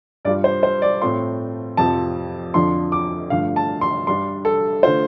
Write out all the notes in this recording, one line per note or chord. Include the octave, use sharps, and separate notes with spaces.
G2 G3 F4 D5
C5
C5
D5
A2 A3 C4 F4 C6
F2 C3 F3 C4 A5
F2 D3 F3 D4 F4 C6
D6
G2 D3 F3 A3 F5
A5
C6
G2 G3 D4 C6
A4
D3 A3 F4 C5